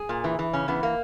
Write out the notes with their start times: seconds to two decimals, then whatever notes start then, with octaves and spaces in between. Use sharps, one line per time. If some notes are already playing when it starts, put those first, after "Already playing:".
Already playing: G#4
0.09 A#2
0.24 E3
0.39 E3
0.53 C#3 C#4
0.68 E3 B3
0.83 A#3